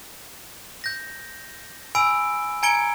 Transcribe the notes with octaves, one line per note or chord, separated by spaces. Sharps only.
G6 A#6
G#5 B5 E6 D7
G#5 A#5 G#6 C#7 D7 G7